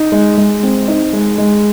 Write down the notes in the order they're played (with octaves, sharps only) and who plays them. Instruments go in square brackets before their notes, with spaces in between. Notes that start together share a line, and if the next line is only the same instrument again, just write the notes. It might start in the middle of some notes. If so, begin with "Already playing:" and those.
Already playing: [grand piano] D#4
G#3
G#3
C4
D#4
G#3
G#3